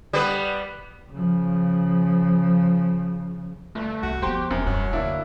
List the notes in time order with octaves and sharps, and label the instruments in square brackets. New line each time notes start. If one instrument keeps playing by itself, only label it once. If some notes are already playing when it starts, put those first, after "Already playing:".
[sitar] G3 B3 B4
[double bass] C#3 F3
[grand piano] G1 [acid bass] A3
[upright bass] C2 [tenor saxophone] F#4
[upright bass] F3 B3 [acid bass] G4 [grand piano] C5 G5 C6
[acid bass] E1 [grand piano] F#2 [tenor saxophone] C4
[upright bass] G2 [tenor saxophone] F#3
[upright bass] D2 [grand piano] A#3 D4 E4